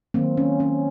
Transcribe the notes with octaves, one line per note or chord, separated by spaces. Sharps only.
D#3 F#3 A#3 C4
C#4
C#4